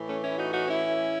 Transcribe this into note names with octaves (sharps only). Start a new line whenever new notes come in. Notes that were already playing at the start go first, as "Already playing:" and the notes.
Already playing: A2 E3
A3 C#4
C#4 E4
D#4 F#4
D#4 F#4
C#4 E4